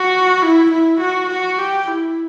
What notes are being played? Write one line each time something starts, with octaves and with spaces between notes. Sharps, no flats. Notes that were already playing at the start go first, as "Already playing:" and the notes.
Already playing: F#4
E4
E4
F#4
F#4
G4
E4